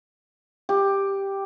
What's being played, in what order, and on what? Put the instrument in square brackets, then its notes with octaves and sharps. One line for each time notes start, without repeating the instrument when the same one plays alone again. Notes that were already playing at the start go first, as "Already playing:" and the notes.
[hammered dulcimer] G4